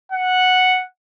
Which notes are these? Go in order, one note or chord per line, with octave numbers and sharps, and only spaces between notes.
F#5